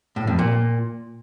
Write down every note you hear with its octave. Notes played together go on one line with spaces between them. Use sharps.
A2
F2
A#2